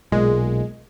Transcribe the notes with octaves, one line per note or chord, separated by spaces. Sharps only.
B1 A#2 G#3